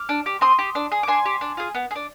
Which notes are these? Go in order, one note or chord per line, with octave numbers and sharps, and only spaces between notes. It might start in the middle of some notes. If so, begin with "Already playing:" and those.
Already playing: D6 F6
D4
G4
C4 C6 D#6
G4
D4
G#4
D6
D4 G#5 C6
G4
D4
F4 G#4
B3
G#4
D4